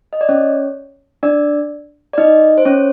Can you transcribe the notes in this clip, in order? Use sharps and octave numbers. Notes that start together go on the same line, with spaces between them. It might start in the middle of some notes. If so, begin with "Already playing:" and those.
D#5
D5
C#4 C#5
D4 D5
D5
D#4 D#5
C5
C#4 C#5